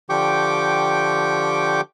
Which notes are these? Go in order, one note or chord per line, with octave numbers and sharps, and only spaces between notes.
D3 F3 G4 G5 C#6 D6